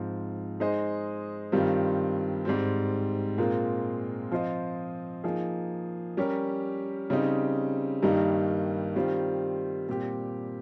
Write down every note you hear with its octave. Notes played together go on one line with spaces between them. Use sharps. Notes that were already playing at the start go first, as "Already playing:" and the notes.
Already playing: G#2 F3 C4
G#3 D#4 G#4 C5 D#5
G2 D#3 G3 C4 F4
G#2 G3 C4
A#2 G#3 C4 F4 A#4
F3 C4 F4 C5 D#5
F3 A#3 D#4 G#4 D#5
G3 C#4 G4 A#4
C#3 G3 C4 D#4
G2 D#3 G3 A#3 D#4
D#3 G3 C4 F4 C5
A#2 G3 C4 G4